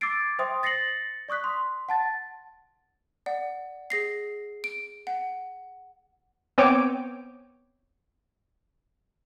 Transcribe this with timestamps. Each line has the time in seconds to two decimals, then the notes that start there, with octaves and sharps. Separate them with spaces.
0.01 D6 E6 G#6 A6 C7 D7
0.39 C5 E5 G5 C6 D#6
0.63 A6 A#6 C7 C#7 F#7
1.29 D5 C#6 D#6 F#6 B6
1.44 C6
1.89 F#5 A5 A6
3.26 D5 F#5
3.90 G#4 A#6 C7
4.64 D7
5.07 F#5
6.58 B3 C4 C#5 G5 D6 D7